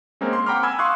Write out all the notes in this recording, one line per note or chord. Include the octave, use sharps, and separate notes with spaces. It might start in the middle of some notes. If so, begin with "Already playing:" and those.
G#3 A#3 C4 C#4 A#4
C6
F#5 G5 A#5 B5 D6 F6
G#5 B5 E6 G#6
F5 C6 C#6 D#6 F#6